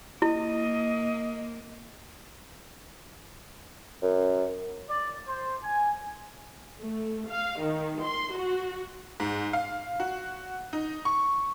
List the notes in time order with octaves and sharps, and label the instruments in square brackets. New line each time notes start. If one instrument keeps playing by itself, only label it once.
[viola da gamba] A#3 [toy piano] E4 [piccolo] D#5
[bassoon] F#2
[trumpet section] D5
C5
G#5
[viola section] A3
F5
D#3
C6
F#4
[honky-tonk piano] G#2
F5
F#4
D#4
C#6